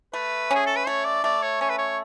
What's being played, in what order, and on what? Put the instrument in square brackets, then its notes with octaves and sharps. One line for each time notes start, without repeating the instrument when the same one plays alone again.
[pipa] A3 [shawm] B4
[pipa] C#4 [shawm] G#4
[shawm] A4
B4
[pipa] A3 [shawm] C#5
[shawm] D5
[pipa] A3 [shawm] D5
[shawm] C#5
[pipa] C#4 [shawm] C#5
[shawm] B4
C#5